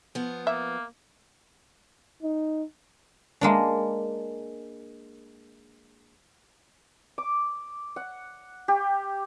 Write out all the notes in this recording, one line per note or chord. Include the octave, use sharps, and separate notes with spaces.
F3 B3
A#3 E5
D#4
G#3 A#3 D4
D6
F#5
G4